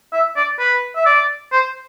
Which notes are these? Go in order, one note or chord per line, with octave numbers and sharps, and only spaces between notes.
E5
D5
B4
E5
D5
C5